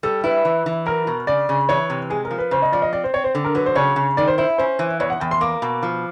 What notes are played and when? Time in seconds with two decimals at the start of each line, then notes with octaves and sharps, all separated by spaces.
0.03 G3 A4
0.24 E4 B4
0.45 E3
0.66 E3
0.86 F#3 A#4
1.07 B2
1.27 C#3 D5
1.49 C#3
1.69 E3 C#5
1.90 C3
2.10 G#3 G#4
2.25 A#4
2.31 F3
2.38 B4
2.51 C#3 C5
2.62 D#5
2.72 F3 D5
2.82 D#5
2.93 C4 D5
3.04 C5
3.14 C4 C#5
3.24 C5
3.35 D3
3.45 A#4
3.55 F#3 B4
3.66 C5
3.75 C#3 C#5
3.96 C#3
4.17 D#3 D5
4.28 C5
4.38 E4 C5
4.58 C#4 C5
4.79 E3
5.00 E2 C#5
5.10 F#5
5.20 E2 G5
5.31 C6
5.41 A#3 D6
5.62 B2
5.83 F3